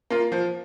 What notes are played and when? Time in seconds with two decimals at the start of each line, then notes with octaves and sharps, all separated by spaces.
0.10 A#3 F4
0.32 F3